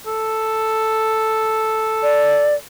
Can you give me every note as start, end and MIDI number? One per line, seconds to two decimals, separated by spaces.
0.07 2.59 69
2.03 2.54 74